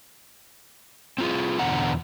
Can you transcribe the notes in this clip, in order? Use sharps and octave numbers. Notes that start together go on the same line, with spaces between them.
C4 F4 G#4
E2 B2 D3 F#5 A#5